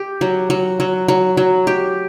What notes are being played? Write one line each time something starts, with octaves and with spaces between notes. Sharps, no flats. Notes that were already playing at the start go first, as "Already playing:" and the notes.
Already playing: G4
F#3
F#3
F#3
F#3
F#3
G4